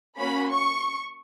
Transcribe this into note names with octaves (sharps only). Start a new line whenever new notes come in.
A#3 C#4 F#4 B5
C#6